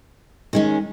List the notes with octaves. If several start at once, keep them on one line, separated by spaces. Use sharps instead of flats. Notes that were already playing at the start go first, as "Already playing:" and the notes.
D#3 G#3 C#4